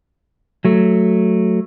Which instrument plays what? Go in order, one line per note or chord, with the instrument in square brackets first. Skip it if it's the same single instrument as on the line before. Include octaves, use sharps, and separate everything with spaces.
[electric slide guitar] F#3 A3